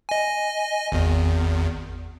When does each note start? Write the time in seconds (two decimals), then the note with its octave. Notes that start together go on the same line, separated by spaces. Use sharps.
0.09 D#5 G#5
0.92 G#1 E2